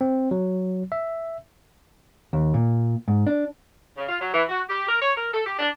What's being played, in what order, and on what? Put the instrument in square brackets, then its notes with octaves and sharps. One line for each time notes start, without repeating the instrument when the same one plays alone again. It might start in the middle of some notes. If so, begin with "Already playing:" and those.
[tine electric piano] C4
F#3
E5
[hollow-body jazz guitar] D#2
A#2
G#2
D4
[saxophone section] C#3
F4
F#3
E3
F#4
G4
A#4
C#5
A#4
A4
G4
D4